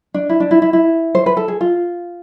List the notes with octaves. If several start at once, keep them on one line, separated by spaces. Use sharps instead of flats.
D4
E4
D4
E4
E4
E4
C5
B4
A4
G#4
F4